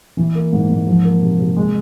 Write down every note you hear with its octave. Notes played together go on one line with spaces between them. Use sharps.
E3
A#3
G#2
G#2
F3
A#3
C3
C3
G#3